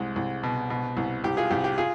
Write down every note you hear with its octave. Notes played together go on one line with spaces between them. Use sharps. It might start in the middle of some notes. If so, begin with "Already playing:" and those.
Already playing: C2 G#3
C2
B2
B2
C2
C2 G4
F4 G#4
C2 G4
G4
F4 G#4